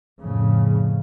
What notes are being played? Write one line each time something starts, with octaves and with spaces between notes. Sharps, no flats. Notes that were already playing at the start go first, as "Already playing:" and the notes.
F2 A2 C#3